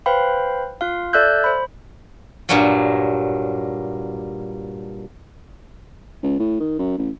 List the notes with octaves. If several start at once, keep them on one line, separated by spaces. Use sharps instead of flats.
B4 C5 F5 G5 B5
F4 F5
A4 D5 E5 E6 F#6 G6
C5 B5
G2 A#2 F#3
C#2
A2
D#3
F#2
A1